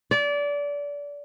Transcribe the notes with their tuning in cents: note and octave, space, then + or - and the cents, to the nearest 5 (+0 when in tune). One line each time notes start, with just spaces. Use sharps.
D5 -25